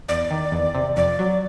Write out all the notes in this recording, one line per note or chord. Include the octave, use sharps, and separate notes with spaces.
E2 D5
D#3
E2
C3
F2 D5
F#3